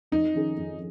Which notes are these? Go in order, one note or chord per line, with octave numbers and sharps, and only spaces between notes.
F2 D#4
D#3 C#4 G#4
F2